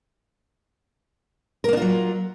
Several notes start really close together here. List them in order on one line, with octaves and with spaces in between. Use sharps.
A#4 A#3 D4 F4 F#3